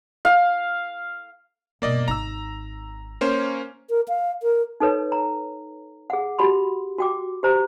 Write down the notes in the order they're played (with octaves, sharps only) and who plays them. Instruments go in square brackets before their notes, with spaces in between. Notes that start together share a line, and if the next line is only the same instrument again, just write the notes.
[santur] F5
[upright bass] G2 B2 [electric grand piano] A#3 D5 D#5
[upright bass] G#1 D#4 [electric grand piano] A#5 E6
[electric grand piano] A#3 C#4 C5
[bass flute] A#4
F5
A#4
[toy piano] D#4 A4 B4 C#5
A#5
G#4 F#5
F#4 G4 B5 C6
F#4 G5 D6
G4 C5 A#5